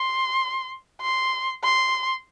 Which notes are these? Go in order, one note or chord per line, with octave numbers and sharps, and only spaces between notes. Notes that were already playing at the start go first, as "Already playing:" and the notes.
Already playing: C6
C6
C6